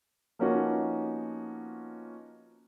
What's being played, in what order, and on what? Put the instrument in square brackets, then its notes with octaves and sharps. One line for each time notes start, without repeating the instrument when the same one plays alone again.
[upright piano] F3 A#3 B3 C#4 D#4 F#4